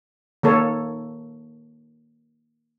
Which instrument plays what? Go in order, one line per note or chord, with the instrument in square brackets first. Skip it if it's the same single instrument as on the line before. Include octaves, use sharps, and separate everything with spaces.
[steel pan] D#3 A#3 A4 C#5